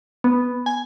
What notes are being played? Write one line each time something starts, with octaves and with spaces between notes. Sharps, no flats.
B3
G#5